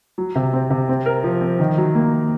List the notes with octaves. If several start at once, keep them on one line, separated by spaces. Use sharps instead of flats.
F#3
C3
C4
C3
C4
A#4
F3
C4
D#3
F#3
A#3